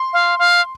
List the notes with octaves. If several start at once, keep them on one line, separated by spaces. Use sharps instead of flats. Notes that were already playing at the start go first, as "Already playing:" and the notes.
Already playing: C6
F5
F5